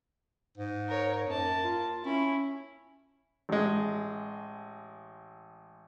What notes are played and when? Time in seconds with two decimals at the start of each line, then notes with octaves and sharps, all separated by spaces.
0.57 G#2
0.88 A#4 C#5
1.27 F#2 A#3 A5
1.64 F4
2.05 C#4 E4
3.49 A1 G#3